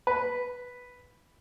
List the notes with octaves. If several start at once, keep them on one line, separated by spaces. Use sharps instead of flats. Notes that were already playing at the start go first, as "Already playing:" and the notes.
B4